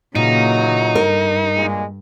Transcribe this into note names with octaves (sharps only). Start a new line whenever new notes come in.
A#2 C#3 E3 F#3 A#3 D#4
G2 A#4
A#2 G#3